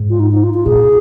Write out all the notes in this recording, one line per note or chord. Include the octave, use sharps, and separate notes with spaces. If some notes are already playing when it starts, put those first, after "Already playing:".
Already playing: G#2
F4
D#4
D#4
F4
F4
A#2 G#4